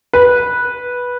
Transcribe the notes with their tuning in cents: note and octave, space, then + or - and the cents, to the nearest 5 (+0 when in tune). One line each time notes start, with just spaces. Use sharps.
B4 -10